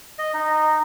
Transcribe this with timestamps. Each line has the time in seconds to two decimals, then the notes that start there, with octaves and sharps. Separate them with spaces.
0.19 D#5
0.34 D#4